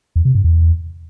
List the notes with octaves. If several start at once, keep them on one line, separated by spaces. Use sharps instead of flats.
E2
C3
G2
E2